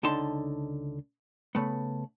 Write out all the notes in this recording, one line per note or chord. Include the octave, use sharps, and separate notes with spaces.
C#2 D3 D#4 A5 C6
C#3 A3 B3